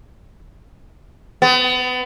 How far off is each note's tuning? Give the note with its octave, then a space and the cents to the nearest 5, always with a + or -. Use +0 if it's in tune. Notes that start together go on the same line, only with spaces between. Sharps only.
B3 +30